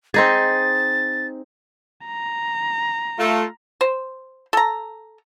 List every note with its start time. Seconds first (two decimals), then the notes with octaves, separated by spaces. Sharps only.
0.14 C4 D#4 G#4 A6
2.06 A#5
3.19 A3 F4
3.81 C5
4.53 A4 A#5